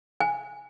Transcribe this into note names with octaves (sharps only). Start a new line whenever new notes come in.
G#5